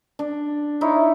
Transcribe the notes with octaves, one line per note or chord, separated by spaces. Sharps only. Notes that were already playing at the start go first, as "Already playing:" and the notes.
D4
D#4 E4 C#5